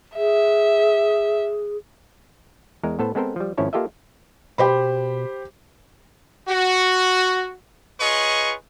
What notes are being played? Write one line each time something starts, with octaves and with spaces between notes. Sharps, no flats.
G#4 E5
E2 G#3 A#4
A2 B3 A4 C5 A5
G#3 B3 C4 A4 A#4 C5
F3 G3
G#1 F3 C#4 E4 C#5 A5
A#3 F4 G4 A4 D#5 E5
B2 G4 C5 B5
F#4
F4 G#4 B4 C#5 D#5 C#6